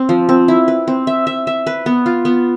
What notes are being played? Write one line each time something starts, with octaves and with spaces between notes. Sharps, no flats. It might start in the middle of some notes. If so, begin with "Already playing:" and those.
Already playing: C4
F3
C4
E4
B4
C4
E5
E5
E5
B4
B3
F4
B3